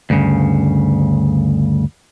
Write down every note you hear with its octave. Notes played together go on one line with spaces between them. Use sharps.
D2 G2 C#3